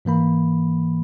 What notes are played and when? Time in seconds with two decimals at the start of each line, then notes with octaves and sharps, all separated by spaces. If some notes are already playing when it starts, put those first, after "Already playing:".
0.05 G#2 E3 A#3 B5